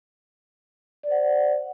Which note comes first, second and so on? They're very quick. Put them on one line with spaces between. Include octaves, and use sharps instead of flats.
D5 C5 F#5